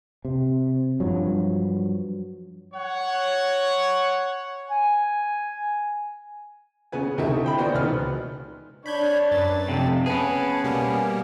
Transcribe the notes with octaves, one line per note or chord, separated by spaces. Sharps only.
C3
G2 F3 F#3
C#5 F#5
G#5
C#3 B3 B4 G#5
D2 C3 A3 D#4 E4 E5
C5 G5 B5
E3 B3 F#4 C5 D5 D#5
C#2 D#3 B4 F6
D4 C#5 B5 G6 G#6
F#2 B4 A6
F2 C3 A4
B3 C#4 G#4 B4 A5
B2 G3 A#3 G#5